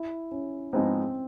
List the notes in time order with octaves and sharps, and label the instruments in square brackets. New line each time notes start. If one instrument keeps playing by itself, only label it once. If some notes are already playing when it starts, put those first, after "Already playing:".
Already playing: [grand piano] E4
C#4
[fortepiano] G#2 F3 G#3 B3 D#4 [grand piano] C4